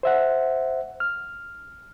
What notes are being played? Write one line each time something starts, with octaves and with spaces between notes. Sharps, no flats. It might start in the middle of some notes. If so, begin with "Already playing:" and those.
C5 E5 F#5
F6